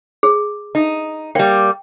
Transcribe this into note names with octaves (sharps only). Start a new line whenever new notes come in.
G#4
D#4
G3 A#3 G5